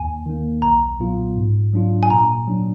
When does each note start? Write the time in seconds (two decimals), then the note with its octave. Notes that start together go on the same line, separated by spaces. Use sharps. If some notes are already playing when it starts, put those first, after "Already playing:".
Already playing: D#2 G#5
0.26 D#3 A#3
0.62 B1 A#5
1.00 A#2 F#3 B3 F4
1.36 G#2
1.73 F#3 D4 F4
2.03 G#5
2.10 A#2 A#5
2.47 F#3 D4